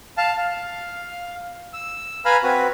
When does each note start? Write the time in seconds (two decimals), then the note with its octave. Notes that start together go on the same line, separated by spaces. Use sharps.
0.18 F5 A5
0.38 F5
1.73 E6
2.25 B4 F5 G#5 A#5 B5 F6
2.43 C4 F#4 B4